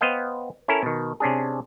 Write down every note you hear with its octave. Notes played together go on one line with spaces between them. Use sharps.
B3 C5 D#5 F5 G5
C#4 E4 A4 A#4
B2 D#3
C3 C#4 D4 G#4